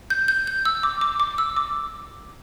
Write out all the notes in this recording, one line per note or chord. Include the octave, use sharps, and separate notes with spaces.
G6
G6
G6
E6
D6
D6
D6
E6
D6